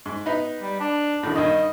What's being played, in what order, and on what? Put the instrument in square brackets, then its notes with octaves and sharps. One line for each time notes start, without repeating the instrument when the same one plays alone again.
[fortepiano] G#2
B3 D#4
[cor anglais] G3
D4
[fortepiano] A2 D3 D#3
[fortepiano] G2 D#3 [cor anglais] D#5